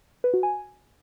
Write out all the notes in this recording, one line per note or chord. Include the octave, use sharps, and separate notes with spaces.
B4
F#4
G#5